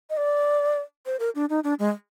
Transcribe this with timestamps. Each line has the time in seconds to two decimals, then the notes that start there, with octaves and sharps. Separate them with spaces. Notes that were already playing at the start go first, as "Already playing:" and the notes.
0.10 D#5
0.17 D5
1.06 C5
1.20 A#4
1.35 D4
1.50 D#4
1.64 D4
1.79 G#3